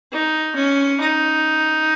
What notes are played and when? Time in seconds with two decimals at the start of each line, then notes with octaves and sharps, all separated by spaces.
0.12 D#4
0.55 C#4
1.00 D#4